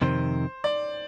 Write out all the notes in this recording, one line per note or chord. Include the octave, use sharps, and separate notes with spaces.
F2 C3 D#3 C5
D5